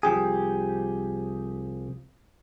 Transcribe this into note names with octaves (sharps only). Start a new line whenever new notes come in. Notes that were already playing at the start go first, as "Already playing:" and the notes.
C2 F3 G4 G#4